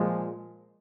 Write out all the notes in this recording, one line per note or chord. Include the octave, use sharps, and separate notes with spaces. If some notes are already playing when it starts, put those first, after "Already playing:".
Already playing: A#2 F3 G#3